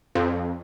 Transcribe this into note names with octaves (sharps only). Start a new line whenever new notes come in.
F2